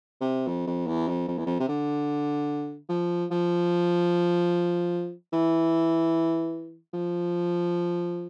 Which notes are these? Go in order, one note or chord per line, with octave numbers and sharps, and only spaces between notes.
C3
F2
F2
E2
F2
F2
E2
F2
C3
D3
F3
F3
E3
F3